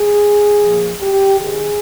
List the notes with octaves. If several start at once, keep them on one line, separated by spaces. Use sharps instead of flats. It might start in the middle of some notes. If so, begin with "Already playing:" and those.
Already playing: G#4
A#2 F3
G4
G#2 D#3 G#4